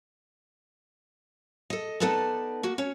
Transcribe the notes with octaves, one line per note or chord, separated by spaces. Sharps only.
A4 D#5
B3 D#4 A4 B4 D5 A5
A#3 F#4
C#4 C#5